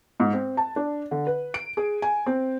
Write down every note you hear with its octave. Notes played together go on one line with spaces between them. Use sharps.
G#2
C4
A5
D4
D3
B4
D7
G#4
G#5
C4